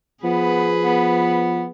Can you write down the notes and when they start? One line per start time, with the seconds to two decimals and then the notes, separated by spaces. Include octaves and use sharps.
0.24 F3 B3 G#4 B4
0.82 B3